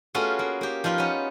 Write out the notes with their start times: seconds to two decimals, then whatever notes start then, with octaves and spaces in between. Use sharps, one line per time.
0.15 A3 B3 C#4 F4 F#4 G#4
0.39 A#3
0.61 A#3 G4
0.84 F3 D#4 F4 B4
0.98 B3 C#4